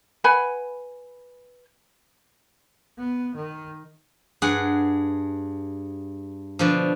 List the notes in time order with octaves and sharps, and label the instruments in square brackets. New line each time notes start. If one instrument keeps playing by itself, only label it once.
[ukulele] B4 F#5 G#5 B5
[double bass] B3
D#3
[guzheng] G2 G#4 F#5
B2 D3 F3